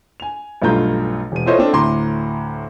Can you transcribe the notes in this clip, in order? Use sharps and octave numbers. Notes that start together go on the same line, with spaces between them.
G#5 F7
B1 G2 A3 F4 A#5 G6
E1 D#7
E4 F4 A4 C5 C#5 D#5
C4 D4 A4
D2 A2 A#5 C6 D6